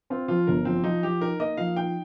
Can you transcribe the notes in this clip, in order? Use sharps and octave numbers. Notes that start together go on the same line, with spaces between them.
C4 F4
F3 F4
G1 A#4
F3 C4
F3 D#4
F3 G4
D#4 A#4
A#3 D#5
F3 F5
D#4 G5